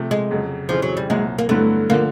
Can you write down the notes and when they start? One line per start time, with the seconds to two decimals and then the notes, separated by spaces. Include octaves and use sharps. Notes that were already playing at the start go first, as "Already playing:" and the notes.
Already playing: C3 F3 A3
0.11 G#3
0.31 F2 C#3 F#3
0.69 F2 C#3 E3 F3
0.82 F#3
0.97 G3
1.09 C2 A#2 F#3 G#3
1.39 A#3
1.49 G2 D3 F#3 A3 B3 E4
1.90 D3 F3 A#3